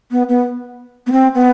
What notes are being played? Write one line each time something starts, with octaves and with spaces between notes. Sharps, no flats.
B3
B3
B3
C4
B3